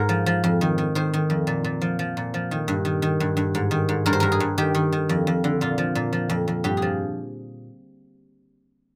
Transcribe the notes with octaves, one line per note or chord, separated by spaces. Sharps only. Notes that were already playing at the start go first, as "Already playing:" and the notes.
Already playing: G#2 A#4
F3
F3
F2
D#3
D#3
D#3 C5
D#3
F2
A#2
A#2
F3
F3
A#2
F3
D#3
G2
D#3
D#3
G2
G2
G#2
D#3
G#2
G2 A#4
C5
G2 A#4
G#4
G2
D#3 G4
D#3
D#3
F2
F2
D3
A#2 F4
F3
A#2
F3
F2
F2
G2 G4
G#4
F3